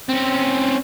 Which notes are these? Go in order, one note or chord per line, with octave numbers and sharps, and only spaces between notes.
C4 C#4